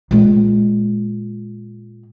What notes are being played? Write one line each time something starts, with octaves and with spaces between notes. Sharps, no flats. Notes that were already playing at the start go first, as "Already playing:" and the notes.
A#2 G#3